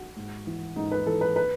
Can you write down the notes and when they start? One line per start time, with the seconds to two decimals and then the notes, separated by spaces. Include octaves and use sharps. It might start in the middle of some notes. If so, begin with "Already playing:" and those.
Already playing: F#4
0.16 G#2
0.47 E3
0.76 G#2 D#4
0.92 B4
1.06 E3 A4
1.21 B4
1.36 B4